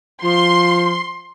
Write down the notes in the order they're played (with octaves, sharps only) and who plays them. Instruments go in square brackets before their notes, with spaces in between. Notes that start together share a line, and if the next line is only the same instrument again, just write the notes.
[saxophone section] F3 [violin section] C6